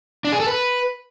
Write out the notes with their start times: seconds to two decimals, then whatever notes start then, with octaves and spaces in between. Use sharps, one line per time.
0.25 D4
0.32 G#4
0.40 A4
0.48 B4